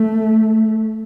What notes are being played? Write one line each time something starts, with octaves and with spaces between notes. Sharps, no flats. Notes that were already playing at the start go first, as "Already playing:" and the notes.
Already playing: A3